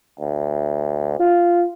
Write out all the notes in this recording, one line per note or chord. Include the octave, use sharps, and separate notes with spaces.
D2
F4